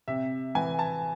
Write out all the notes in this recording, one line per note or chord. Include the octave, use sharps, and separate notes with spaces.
C3 E5
E3 G#5
A5